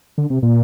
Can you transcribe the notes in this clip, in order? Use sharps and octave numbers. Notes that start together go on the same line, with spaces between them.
D3
C3
A#2